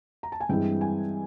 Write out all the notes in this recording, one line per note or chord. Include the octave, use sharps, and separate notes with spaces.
A#5
A5
G#5
G2 E3 G#3 C4 E4 G5
G#5